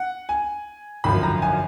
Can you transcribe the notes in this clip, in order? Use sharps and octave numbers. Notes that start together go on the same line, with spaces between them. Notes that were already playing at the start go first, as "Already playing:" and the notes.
Already playing: F#5
G#5
G#1 F#2 D3 F3 B5
A#5
G#5